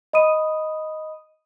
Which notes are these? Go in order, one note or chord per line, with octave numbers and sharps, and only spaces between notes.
D#5 B5 D#6 D#7